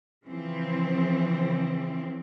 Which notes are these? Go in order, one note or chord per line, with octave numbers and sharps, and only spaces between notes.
C#3 E3 F3 C4